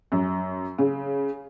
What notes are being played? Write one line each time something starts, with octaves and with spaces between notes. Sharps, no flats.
F#2
C#3